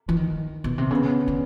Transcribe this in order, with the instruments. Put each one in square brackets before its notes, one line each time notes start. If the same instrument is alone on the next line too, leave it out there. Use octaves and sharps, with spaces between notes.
[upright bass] E3
D#3
B2
C3
[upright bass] C#3 [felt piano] B3 C#4
[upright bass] D3